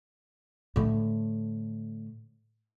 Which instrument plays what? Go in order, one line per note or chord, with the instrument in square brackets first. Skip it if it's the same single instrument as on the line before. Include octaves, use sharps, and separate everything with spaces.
[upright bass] A2 D3